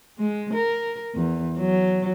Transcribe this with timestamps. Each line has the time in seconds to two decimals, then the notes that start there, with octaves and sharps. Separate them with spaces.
0.19 G#3
0.54 A#4
1.15 E2
1.59 F#3